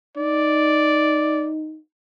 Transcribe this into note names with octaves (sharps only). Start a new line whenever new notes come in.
D#4 D5